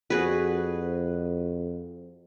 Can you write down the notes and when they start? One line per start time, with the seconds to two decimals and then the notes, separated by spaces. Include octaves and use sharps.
0.10 F2 F#4 G#4 B4